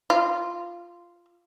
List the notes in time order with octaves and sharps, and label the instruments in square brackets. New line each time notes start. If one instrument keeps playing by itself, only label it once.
[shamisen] F4